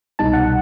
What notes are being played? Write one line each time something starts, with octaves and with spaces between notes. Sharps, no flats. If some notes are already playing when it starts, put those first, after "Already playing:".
C2 B2 G3 D#4 A5
F#5